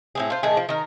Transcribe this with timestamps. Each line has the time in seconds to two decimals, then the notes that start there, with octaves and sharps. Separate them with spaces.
0.15 A2 C4 G#4
0.30 F4 C5
0.43 A2 D#3 D4 G#4
0.57 F3
0.69 D#3 A#4